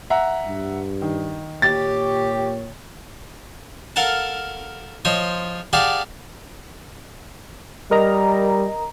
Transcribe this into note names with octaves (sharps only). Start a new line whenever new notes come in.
E5 F#5 A#5
G2
D#3
A#2 G4 C#5 A6
A4 A#4 F5 F#5 A5
F3 C5 C#5 D#5
G4 G#4 D5 F5 F#5 A5
G3 A#4 D#5 A#5